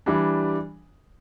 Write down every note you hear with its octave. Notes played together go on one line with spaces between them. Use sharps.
E3 G3 D4